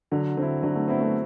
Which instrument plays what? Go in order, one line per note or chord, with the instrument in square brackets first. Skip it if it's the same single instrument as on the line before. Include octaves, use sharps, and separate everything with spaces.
[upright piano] D3 [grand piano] F#3
[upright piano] D3 [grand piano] C4 E4
[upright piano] D3 [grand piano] F#3
[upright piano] A3
[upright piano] B3 [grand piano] C4 E4
[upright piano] A3